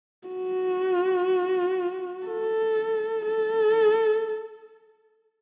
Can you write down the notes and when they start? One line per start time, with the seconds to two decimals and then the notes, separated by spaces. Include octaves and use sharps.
0.28 F#4
2.27 A4
3.27 A4